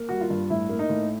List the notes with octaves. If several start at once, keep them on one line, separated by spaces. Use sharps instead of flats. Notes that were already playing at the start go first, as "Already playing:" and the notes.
Already playing: A#3
G3 F#4
F4
G2
A2 E4
A#3
D#4
A2